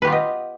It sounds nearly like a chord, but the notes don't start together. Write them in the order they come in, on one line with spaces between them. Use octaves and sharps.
B4 G4 F4 B3 D#5